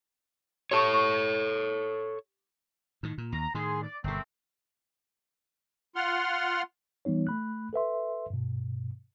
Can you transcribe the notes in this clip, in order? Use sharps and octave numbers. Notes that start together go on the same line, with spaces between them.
G4 A4 C#5 A5 C#6
C#6
A2 D#3
A#2
D#2 A#5
A2 D#3 G#4 C6
D5
G1 B2 A3 A#3 C4
F4 F#5 C6 F6
E3 G3 B3 D#4 C#5
A3 B5 F#6
A4 B4 E5 C6
G2 B2